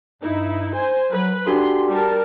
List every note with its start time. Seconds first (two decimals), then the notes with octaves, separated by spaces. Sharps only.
0.22 G2 D#4 E4
0.76 C5 G#5
1.12 F#3 B4
1.47 D4 F#4 G4 A4 C6
1.88 G3 A#4 A5